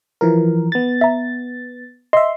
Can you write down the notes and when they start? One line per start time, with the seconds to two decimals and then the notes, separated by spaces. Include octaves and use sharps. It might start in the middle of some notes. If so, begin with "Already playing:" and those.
0.21 E3 F3 A#4
0.72 B3 A6
1.01 E5 A#5
2.13 D#5 E5 C6